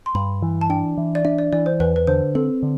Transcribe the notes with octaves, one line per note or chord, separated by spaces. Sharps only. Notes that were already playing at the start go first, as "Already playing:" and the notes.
C6
G2 B5
E3
A5
D4 G5
E3
D5
D4 E5
D5
E3 D5
C5
E2 B4
B4
D3 C5
C4 A4
D3